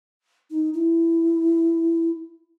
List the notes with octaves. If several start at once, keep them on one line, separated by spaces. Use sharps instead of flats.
D#4
E4